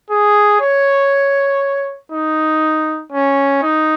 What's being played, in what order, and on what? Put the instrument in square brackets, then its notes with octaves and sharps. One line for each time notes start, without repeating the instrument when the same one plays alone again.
[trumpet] G#4
C#5
D#4
C#4
D#4